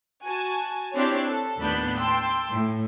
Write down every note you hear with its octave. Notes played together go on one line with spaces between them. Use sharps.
F#4 G#5 A5
C4 D4 E4 G4 C#5 C6
A4
D#2 A2 B3 D4 B5 G6
G5 A5 C6 E6
A2